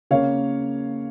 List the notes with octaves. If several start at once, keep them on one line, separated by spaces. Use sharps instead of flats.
C#3 A#3 C#4 C#5 F5